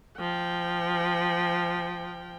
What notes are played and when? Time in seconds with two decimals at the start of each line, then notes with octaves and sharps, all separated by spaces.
0.19 F3 G5